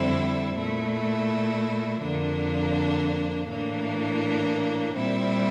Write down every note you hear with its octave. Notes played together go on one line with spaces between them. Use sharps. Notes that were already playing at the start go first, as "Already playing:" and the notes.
Already playing: F2 D3 G3 C4 E4
A#2 A3 E4
F2 D3 F3 A#3 D4
A2 E3 A#3 D4
A#2 G3 C4 E4